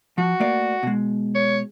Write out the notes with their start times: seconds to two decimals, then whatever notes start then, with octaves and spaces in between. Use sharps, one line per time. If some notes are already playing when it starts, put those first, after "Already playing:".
0.18 F3 F#4
0.40 A3 A#3 D5
0.83 B2 G#3
1.35 C#5